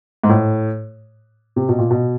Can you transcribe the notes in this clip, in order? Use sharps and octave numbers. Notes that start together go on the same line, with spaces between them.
G#2
A2
C3
B2
A#2
B2